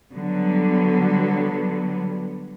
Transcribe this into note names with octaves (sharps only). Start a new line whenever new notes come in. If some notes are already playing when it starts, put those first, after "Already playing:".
D3 F#3 G3 B3